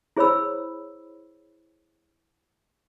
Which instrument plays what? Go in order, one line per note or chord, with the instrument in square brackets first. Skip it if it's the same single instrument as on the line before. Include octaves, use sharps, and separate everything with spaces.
[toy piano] E4 G#4 C5 C#5 B5 E6